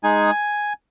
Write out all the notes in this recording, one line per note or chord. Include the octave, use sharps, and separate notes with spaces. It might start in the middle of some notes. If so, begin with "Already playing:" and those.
G#3 D#4 G#4 G#5